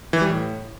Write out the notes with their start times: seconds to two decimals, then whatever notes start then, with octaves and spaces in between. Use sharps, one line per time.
0.13 E3
0.22 G3
0.30 A2